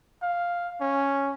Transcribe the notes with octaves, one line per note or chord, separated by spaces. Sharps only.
F5
C#4